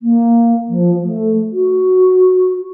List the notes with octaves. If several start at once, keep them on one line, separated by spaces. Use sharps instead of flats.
A#3
F3
A3
F#4